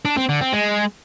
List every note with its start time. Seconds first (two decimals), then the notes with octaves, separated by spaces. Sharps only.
0.05 D4
0.17 C4
0.29 D3
0.41 C4
0.53 G#3